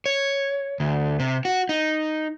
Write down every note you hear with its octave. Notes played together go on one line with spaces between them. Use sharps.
C#5
D2
C3
F#4
D#4